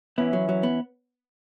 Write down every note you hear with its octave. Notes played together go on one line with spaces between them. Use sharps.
E3 B3 C#4 E4
F#3
F#3
B3